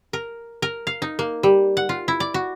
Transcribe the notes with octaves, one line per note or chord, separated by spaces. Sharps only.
A#4
A#4
F5
D#4
A#3
G3
F#5
F4
E4
D5
F#4